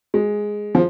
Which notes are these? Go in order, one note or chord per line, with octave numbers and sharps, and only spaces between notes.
G#3
F3